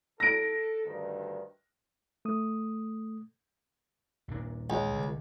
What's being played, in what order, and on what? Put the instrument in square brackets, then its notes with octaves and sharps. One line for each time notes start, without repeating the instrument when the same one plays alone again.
[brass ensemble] A4 [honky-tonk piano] A#6 D7
[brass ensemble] D2 G2 D#3
[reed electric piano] A3 D#6
[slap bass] D#2 A#2 D4
[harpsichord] C#2
[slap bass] C2 D3